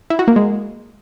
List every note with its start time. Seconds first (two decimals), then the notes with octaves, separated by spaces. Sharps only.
0.10 E4
0.19 F#4
0.28 A#3
0.36 G#3